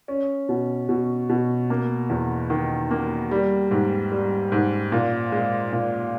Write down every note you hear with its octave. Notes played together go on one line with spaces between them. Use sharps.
C#4
B2
B2
B2
A#3
E2
D#3
A#3
G3
G#2
G3
G#2
A#2
G#3
A#2